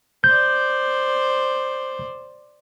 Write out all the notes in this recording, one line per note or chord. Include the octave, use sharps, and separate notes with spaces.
C5 D5 G6